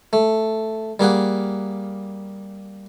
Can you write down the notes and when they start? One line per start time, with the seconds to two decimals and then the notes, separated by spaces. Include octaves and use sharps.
0.13 A3
1.00 G3 A#3 G#4 F#5